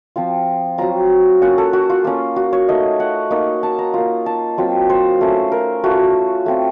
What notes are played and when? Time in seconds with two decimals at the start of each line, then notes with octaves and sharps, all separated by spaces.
0.16 F3 C4 F4
0.78 F#3 C4 F4 A#5
1.42 A#3 C#4 F4 F#5
1.58 A4
1.73 F#4
1.90 F4
2.04 A#3 C#4 F4
2.36 F#4
2.53 C#5
2.68 A3 D#4 D#5
3.00 F#5
3.31 A#3 D#4
3.63 A5
3.79 A#5
3.94 A#3 F4
4.26 A5
4.58 F#3 C4 F4
4.90 C5
5.21 A3 C#4 F4
5.52 A#4
5.84 A3 C#4 F4 F#4
6.46 A3 C4 F4